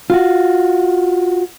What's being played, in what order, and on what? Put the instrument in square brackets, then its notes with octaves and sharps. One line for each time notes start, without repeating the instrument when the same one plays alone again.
[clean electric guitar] F4 F#4